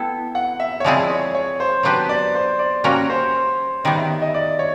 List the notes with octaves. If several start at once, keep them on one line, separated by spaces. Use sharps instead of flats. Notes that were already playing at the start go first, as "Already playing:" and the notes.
Already playing: B3 E4 A4 G5
F#5
E5
C#5
F3 G#3 C4 E4 G#4 D5
C#5
C#5
C5
F#3 B3 D4 G4 B4 C5
D5
C5
D5
G3 A#3 C#4 F#4 A#4 C#5
C5
D#3 G3 B3 C#5
E5
D#5
D5
C#5